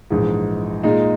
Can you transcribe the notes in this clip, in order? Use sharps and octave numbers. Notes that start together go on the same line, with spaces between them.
A#1 G#2 E3 G#3
A#2 G#3 D#4